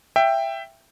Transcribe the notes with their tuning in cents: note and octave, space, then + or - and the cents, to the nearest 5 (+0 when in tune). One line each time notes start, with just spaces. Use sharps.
E5 +15 G5 +5